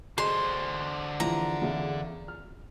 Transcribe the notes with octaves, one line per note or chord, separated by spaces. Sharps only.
D3 G#4 C5 D#5 C6
E2 E3 F3 A#5
E2 C#3
F6